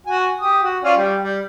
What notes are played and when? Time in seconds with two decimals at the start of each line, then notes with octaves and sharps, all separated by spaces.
0.06 F#4 G#5
0.41 G4 D#6
0.63 F#4
0.84 C#4 F4 D5
0.97 G3 G4
1.22 G3